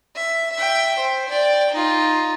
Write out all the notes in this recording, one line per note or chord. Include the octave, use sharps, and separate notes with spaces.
E5
E5 G5
C5
D5 G5
D#4 F4